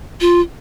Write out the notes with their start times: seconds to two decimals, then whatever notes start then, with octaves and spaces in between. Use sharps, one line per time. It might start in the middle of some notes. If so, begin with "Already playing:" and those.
0.21 F4